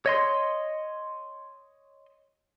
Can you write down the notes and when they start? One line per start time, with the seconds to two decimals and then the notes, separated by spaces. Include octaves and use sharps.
0.06 C#5 D#5 C6